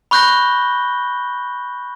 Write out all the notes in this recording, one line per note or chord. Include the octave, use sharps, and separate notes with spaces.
B5 C#6 F#6 G6 A#6 G7